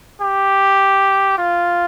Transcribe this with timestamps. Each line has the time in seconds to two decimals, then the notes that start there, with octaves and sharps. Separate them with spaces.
0.21 G4
1.38 F4